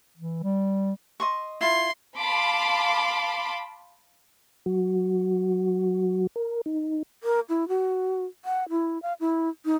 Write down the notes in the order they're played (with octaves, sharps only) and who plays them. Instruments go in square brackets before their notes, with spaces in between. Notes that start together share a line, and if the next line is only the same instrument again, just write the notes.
[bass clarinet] E3
G3
[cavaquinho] D#5 C6 C#6
[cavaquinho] E4 F4 [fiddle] C6
[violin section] F5 A5 B5 C6 D6
[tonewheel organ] F#3 F#4
A#4
D#4
[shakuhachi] A#4
E4
F#4
F#5
E4
F5
E4
D#4